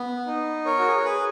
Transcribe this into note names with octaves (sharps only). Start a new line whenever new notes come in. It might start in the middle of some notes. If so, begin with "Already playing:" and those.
Already playing: B3
D#4
A#4 C#5
F#4
G#4
A#4
G#4 B4